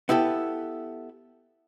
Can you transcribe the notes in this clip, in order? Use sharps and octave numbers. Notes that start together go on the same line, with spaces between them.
B3 E4 G4 A4